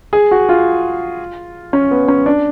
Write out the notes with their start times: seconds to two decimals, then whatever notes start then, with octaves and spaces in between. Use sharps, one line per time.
0.13 G#4
0.31 F#4
0.49 F4
1.73 C#4
1.91 B3
2.08 C#4
2.26 D4